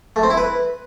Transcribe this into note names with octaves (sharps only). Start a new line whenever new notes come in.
A3
C4
E4
B4